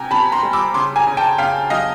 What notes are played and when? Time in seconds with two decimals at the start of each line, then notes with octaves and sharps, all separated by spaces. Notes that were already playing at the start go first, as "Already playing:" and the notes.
Already playing: C3 G5 G#5 A#5
0.11 C3 A5 B5
0.32 A#5 C6
0.43 G3
0.53 D6 E6
0.74 C#3 C6 D6
0.96 G#5 A#5
1.07 C#3
1.17 G5 A5
1.38 C#3 F5 G5
1.70 F#3 D#5 F5